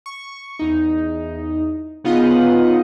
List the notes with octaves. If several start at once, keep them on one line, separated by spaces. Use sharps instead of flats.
C#6
E2 D#4
C#3 B3 D#4 F4 D#5 F#5